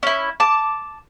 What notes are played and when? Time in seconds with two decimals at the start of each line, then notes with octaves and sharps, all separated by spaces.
0.03 C#4 E4
0.40 A5 D6